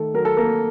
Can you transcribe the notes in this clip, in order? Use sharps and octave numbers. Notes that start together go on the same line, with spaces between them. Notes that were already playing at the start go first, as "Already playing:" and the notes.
Already playing: D#3 A3 A4
F#3 A#4
A4
A#3 A#4